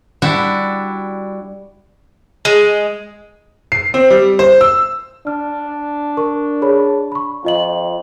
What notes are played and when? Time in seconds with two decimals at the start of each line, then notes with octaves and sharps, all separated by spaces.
0.22 G3 D4 E4 F#4
2.45 G#3
3.72 C7
3.94 C4
4.10 G3
4.39 C5
4.61 E6
5.27 D4 F6
6.17 A#4 C#6
6.62 G#4 C#5 B5
7.12 B5 C#6
7.45 F2 F4 D#5 F#7